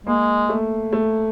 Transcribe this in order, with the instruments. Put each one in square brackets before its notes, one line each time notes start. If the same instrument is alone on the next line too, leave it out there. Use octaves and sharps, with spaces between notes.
[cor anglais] G#3 [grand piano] A#3
[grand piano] A3
A3